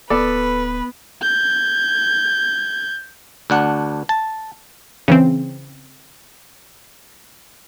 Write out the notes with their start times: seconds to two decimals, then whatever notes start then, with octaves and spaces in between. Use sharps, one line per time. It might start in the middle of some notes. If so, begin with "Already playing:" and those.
0.10 D1 B3 A4 B4 D5
1.22 G6 G#6
3.50 D2 D4 F#5
4.09 A5
5.08 C#3 E3 C4